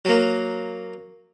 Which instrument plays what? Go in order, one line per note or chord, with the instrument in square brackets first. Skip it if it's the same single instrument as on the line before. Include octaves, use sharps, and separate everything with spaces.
[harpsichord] F#3 A#3